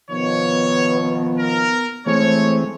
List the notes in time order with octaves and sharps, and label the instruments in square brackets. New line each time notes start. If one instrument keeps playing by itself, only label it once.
[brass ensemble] B2 D#3 F3 [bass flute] B3 [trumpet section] C#5
[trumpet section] A#4
[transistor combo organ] E3 G#3 C4 [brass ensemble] A3 [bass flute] C5 [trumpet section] C#5